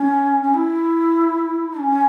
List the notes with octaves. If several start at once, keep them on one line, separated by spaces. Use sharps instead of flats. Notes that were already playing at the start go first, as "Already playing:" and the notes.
Already playing: C#4
C#4
E4
C#4